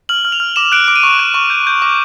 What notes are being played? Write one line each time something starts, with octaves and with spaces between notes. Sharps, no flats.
F6 F#7
F6
F7
F6
D6 E7
F#6 D7
D6 D7
D#7
C#6 D7
F#6
C#6
G6
G6
D6